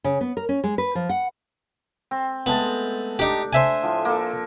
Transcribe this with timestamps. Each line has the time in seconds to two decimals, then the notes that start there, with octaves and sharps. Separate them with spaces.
0.04 C#3
0.21 B3
0.37 A#4
0.49 C#4
0.64 G#3
0.78 B4
0.95 F3
1.10 F#5
2.11 C4
2.46 G#3 A3 B3 A5
3.19 D4 D#4 G4
3.53 C5 E5 G#5
3.83 A2 F3
4.05 A#3 A4